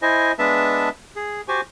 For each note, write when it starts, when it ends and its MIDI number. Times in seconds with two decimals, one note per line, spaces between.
0.02 0.32 64
0.02 0.32 72
0.02 0.32 75
0.02 0.32 80
0.39 0.89 56
0.39 0.89 59
0.39 0.89 62
0.39 0.89 71
0.39 0.89 76
0.39 0.89 81
1.16 1.41 68
1.48 1.61 66
1.48 1.61 67
1.48 1.61 72
1.48 1.61 80